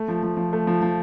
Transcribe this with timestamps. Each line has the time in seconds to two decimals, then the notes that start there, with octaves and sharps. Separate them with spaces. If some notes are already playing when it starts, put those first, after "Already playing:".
Already playing: A3
0.08 F3
0.23 F3
0.37 F3
0.53 A3
0.67 F3
0.82 F3